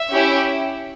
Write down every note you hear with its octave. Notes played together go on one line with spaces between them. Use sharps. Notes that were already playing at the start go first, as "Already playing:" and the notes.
Already playing: E5
C#4 E4 G4